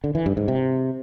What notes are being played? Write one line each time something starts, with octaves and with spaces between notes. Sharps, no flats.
D3
E3
G2
G#2
C3